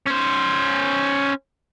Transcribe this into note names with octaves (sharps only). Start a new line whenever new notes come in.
C#4 C5